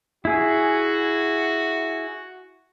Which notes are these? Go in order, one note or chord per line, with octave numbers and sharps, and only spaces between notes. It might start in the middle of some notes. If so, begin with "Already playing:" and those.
E4 F#4 G#4